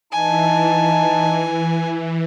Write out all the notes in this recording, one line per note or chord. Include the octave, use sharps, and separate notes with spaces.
E3 D#4 G#5 A5